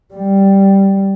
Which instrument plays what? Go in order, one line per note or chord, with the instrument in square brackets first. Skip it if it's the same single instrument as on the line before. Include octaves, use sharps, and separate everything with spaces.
[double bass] G3